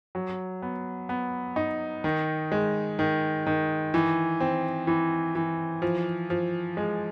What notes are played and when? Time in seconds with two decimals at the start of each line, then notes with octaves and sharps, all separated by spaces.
0.15 F#3
0.62 B3
1.09 B3
1.56 D#4
2.04 D#3
2.52 G#3
2.99 D#3
3.47 D#3
3.94 E3
4.40 C4
4.87 E3
5.35 E3
5.82 F3
6.30 F3
6.77 G#3